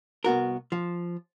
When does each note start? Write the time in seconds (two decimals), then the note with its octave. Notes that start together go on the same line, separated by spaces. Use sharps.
0.24 C2 B3 F#4 A#4
0.72 F3